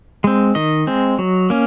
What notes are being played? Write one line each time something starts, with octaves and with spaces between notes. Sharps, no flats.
G#3 C4
D#3 D#5
G#3 C4
F#3
A#3 C#4